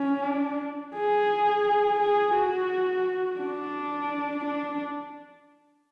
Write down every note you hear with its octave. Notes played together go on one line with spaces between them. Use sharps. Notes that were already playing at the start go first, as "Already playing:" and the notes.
Already playing: C#4
D4
G#4
G#4
F#4
D4
D4